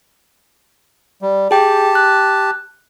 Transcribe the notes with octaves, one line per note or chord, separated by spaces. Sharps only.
G3
G4 G#4 G5 A5
F#6